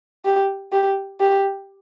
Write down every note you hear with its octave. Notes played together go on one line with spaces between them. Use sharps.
G4
G4
G4